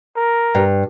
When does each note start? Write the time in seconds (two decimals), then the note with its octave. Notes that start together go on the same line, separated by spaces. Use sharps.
0.16 A#4
0.55 G2